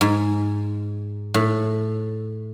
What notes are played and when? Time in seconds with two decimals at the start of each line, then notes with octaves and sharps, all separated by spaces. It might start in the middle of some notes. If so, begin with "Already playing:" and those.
0.01 G#2
1.34 A2